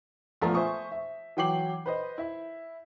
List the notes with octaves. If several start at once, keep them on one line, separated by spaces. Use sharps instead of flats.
A#1 F3 A3 B3 A5 A#5
C5 E5 G#5 C#6 D#6
E5
E3 F#3 G5 D6 C7 F#7
B4 C5 D#5
E4 E5